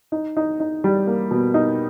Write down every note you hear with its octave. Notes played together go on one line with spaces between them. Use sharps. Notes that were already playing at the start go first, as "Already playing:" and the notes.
D#4
D#4
D#4
G3
A#3
B2
D#4